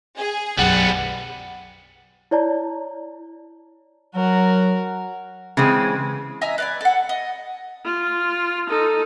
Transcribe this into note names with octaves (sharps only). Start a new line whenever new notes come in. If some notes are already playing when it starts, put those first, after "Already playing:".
G#4
B1 F#2 G3 B3 F#5
E4 C#5 D5 A5 A#5
F#3 F#4 A#4
C#3 E3 G#3 C4
D#5 E5 G#5 A#5
B4 D5 G#5
A4 F#5
D#5
F4
D#4 A4